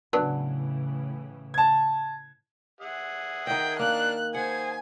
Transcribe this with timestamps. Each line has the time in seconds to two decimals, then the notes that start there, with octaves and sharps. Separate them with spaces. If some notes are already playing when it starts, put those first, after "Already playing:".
0.13 A2 C#3 E3 F#3 B3 D4
1.54 A5 G#6
2.81 G#4 E5 F#5
3.47 D#3 D#5 G5
3.79 A#3 D4 F5 F#6
4.35 G#4 C5 F#5 G#5